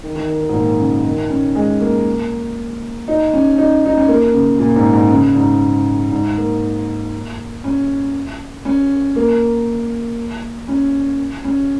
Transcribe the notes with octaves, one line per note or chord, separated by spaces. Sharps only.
D#3
D#3
D#3
D#3
G#2
A#2
C#3
D#3
C#4
G#3
A#3
D#4
C#4
D#4
D#4
C#4
A#3
C#3
A#2
G#2
G#2
C#3
G#2
G#2
A#3
C#4
C#4
A#3
C#4
C#4